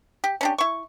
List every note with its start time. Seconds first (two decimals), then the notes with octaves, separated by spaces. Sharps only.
0.24 G4
0.41 C#4 D4 G4
0.58 E4 C#6